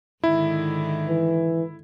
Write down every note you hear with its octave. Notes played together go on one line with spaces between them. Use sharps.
G#2 D3 D#3 E4
E3